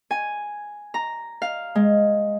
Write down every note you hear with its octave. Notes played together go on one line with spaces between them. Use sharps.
G#5
A#5
F5
G#3